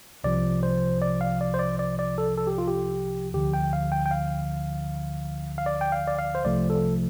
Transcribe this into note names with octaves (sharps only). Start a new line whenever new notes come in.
C2 C3 F3 D5
C5
D5
F5
D5
C5
D5
D5
D5
A4
A4
G4
F4
G4
D2 D3 F3 G4
G5
F5
G5
G5
F5
F5
D5
G5
F5
D5
F5
C5
C2 C3 F3 A3 D5
A4